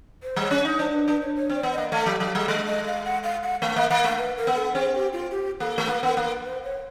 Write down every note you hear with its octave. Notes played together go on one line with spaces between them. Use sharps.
C5
G3 C#5
C#4
D#4
D4 C5
B4
D4 B4
C#5
C#5
C4 D5
B3
D#5
A#3
A3 F5
F#3 F5
F#3 F5
G3
G#3 D#5
D#5
F5
F#5
F5
F#5
A3 F5
A#3 E5
A#3 F#5
A3 F5
B4
A#4
B3
A4
C4 G#4
G4
F4
G4
A#3 A4
A3
A#3 B4
B3 A#4
A#3
B4
C5
C#5